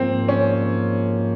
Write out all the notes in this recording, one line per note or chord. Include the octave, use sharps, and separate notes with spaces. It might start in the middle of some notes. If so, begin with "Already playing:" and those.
Already playing: G#2 F3 A#3 C4
C#4